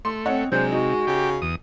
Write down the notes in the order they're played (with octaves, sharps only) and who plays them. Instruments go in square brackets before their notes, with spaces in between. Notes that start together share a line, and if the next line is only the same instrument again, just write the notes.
[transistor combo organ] A3 [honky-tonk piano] C6
[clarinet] C4 [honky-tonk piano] C#5 D#5 F#5
[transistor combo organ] C3 [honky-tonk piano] F#3 D4 [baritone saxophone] G#3 [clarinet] C5
[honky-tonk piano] D#4 [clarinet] F#4
[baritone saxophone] C#3 [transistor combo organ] G4
[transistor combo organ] E2 D#6